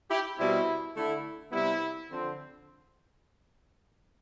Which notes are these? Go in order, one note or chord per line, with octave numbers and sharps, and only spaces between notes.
E4 G4
B2 G3 C4 E4
D3 A3 E4
C3 G3 B3 E4
D3 F3 C4